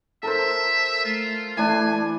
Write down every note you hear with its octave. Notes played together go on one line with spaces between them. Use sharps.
A4 A#4 C5 E5
A3 F4
E3 A3 D4 G#5